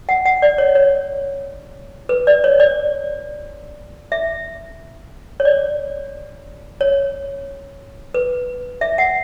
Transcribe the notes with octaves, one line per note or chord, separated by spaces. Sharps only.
F#5
F#5
D5
C#5
C#5
B4
D5
C#5
D5
E5
C#5
D5
C#5
B4
E5
F#5